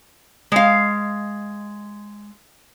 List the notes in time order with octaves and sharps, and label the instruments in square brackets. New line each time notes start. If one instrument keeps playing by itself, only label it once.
[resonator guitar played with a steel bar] G#3 F5